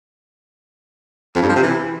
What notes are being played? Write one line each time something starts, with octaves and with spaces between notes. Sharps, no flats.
F2
G2
F3
C3
E3